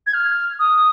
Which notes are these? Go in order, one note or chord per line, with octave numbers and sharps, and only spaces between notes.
G#6
F6
D#6